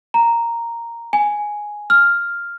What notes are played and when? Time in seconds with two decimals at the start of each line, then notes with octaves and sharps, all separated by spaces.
0.14 A#5
1.13 G#5
1.90 F6